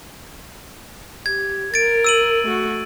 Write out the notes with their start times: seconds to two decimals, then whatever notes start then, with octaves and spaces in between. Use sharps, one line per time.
1.26 G4 G#6
1.74 A#4 A6 D7
2.04 E6 D#7 F#7
2.44 A3 F#4